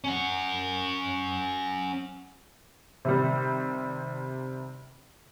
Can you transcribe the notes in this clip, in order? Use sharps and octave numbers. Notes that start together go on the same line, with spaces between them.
C#4 F#5
C3 D#3 G3